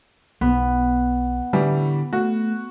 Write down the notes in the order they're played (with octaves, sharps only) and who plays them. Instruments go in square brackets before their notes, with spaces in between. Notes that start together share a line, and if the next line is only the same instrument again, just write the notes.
[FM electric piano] B1 [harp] B3
[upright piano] A2 E3 G3 [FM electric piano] D3
[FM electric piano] A3 [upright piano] F#4